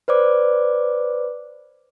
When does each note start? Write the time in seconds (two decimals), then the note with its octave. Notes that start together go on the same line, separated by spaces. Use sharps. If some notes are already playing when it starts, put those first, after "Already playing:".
0.08 B4 C5 D5 D6